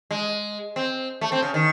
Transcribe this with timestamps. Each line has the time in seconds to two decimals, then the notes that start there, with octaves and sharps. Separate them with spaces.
0.11 G#3
0.76 C4
1.21 A3
1.32 C4
1.42 C#3
1.54 D#3